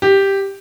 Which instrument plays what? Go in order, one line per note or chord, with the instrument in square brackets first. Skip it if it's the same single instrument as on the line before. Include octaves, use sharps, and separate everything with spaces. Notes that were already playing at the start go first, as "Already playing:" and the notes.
[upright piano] G4